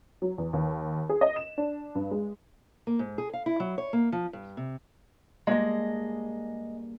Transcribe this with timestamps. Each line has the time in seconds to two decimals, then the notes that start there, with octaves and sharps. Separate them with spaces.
0.22 F#3
0.38 E2
0.53 D#2
1.09 G#4
1.21 D#5
1.36 E7
1.58 D4
1.95 G2
2.11 G#3
2.87 A#3
2.99 G#2
3.18 G#4
3.33 F5
3.46 E4
3.60 F#3
3.78 C#5
3.93 A#3
4.12 F3
4.33 G2
4.57 C3
5.47 G2 G#3 A#3 G#4 D#5